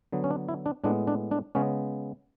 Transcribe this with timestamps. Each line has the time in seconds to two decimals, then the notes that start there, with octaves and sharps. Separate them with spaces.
0.12 D3 F#3 B3
0.24 C#4
0.30 D4
0.49 E4
0.66 D4
0.84 A2 G#3 B3 D4
1.07 D4
1.31 D4
1.55 C#3 G#3 B3 C#4